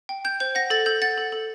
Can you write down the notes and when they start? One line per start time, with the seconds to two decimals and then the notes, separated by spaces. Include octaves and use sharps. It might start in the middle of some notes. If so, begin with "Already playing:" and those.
0.09 G5
0.25 G5 G6
0.40 C5 G6
0.55 F#5 A#6
0.70 A4 A6
0.86 A4 G6
1.02 F#5 A6
1.18 A4
1.32 A4